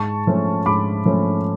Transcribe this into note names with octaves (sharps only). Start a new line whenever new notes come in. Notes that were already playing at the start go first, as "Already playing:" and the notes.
Already playing: G#2 A5 C#6
F3 A3 C#4
G#2 B5 D6
F3 A3 C#4